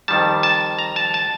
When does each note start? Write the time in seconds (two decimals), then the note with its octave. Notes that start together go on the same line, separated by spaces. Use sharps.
0.08 F2 D#3 G3 A5
0.43 A5
0.79 A#5
0.96 A5
1.14 A5